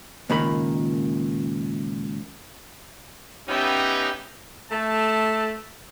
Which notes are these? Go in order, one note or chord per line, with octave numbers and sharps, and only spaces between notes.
C#2 A#2 D#3 A#3 B5
B3 C#4 D#4 G4 E5 G5
A3 A5